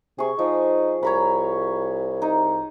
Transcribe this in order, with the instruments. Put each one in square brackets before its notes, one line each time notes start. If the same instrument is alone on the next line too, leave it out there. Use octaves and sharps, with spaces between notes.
[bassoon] C3 [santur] G#4 C#6
[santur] F3 [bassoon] D#4
[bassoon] C2 [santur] C#5 A#5 B5
[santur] D#4